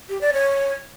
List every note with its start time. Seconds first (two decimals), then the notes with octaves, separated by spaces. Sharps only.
0.09 G4
0.21 D5
0.33 C#5